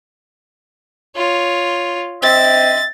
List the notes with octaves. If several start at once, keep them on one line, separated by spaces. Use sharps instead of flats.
F4 C#5
C4 D#5 E5 A6